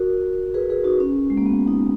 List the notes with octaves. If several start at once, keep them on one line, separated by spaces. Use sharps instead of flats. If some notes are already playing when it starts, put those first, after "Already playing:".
Already playing: F#4 A#4
G#4 B4
G#4 B4
D#4 F#4
C#4
G#3
A#3
B3
D#4